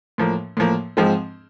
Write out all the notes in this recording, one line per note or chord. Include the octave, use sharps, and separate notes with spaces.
A2 F3 A#3
A2 F3 A#3
G#2 F3 G#3 C4